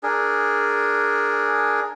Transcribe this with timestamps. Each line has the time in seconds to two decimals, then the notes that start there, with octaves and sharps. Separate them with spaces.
0.03 D4 G#4 A#4